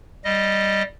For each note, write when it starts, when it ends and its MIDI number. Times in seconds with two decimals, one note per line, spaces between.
0.25 0.82 55
0.25 0.82 75